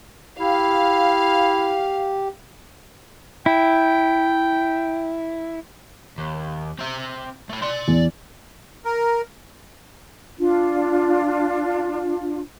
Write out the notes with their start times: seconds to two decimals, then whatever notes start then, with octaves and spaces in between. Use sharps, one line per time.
0.39 E4 G4 F5
3.46 E4 G5
6.18 D#2
6.79 C4 E5
7.50 A3 C#5
7.62 D5 C6
7.88 E2
8.85 A#4
10.39 D4 F4